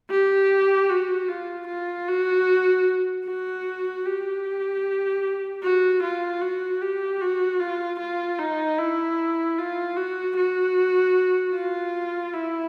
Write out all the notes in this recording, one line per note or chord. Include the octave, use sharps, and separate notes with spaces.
G4
F#4
F4
F4
F#4
F#4
G4
F#4
F4
F#4
G4
F#4
F4
F4
D#4
E4
F4
F#4
F#4
F4
E4